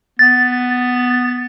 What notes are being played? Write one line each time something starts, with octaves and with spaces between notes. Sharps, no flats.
B3 A6